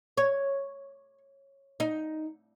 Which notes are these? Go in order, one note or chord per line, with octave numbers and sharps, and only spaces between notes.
C#5
D#4